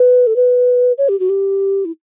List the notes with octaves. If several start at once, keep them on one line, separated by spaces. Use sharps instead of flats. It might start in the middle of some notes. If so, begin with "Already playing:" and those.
Already playing: B4
A4
B4
C#5
G4
F#4
G4
E4